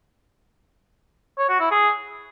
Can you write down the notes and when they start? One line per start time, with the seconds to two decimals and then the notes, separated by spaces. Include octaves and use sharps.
1.38 C#5
1.49 F#4
1.60 E4
1.71 G#4